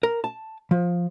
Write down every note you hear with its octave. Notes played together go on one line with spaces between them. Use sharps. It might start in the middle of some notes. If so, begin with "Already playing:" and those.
A#4
A5
F3